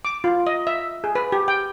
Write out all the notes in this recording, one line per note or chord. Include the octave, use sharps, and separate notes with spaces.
D6
F4
D#5
E5
G#4
B4
G4
G5